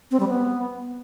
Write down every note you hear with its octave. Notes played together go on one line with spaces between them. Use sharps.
C4
G3
B3